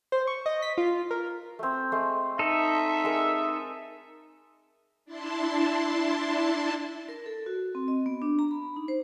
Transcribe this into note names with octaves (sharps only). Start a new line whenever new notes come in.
C5
C#6
D#5
B6
F4
A#4
A3 C4
G#3 A3 C6
D#4 A4 E5
G#3 G#4 A#4
D4 E4 A5 C6
A#4
A4
F#4
C4
D#5
B3
D4
A#5
B5
D#4
C5